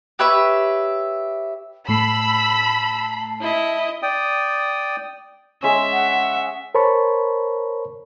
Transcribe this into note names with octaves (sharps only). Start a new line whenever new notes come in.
G4 B4 C#5 E5
A2 A3 A5 B5 E6 C7
E4 D#5
D5 G5 D#6
G#3 C#4 E5
F#5
A#4 C5 C#5 A5 B5 C#6